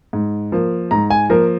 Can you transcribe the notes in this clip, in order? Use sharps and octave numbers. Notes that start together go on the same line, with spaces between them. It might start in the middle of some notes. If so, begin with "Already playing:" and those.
G#2
F3 A#3
G#2 A#5
G#5
F3 A#3 A#4